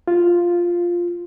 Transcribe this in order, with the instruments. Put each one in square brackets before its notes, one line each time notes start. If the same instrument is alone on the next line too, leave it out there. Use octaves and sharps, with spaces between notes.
[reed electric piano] F4